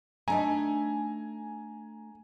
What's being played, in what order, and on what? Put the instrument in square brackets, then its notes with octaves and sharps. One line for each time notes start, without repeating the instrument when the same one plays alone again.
[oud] A3 D4 D#4 [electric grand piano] G#5 A#5